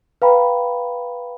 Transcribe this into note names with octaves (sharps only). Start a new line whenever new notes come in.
B4 F5 G5 A#5 B5